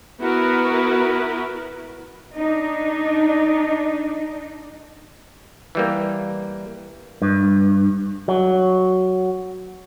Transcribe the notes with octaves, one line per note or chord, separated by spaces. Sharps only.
B3 E4 F#4 A#4 B4
D4 D#4
E3 G3 A#3
G2
F#3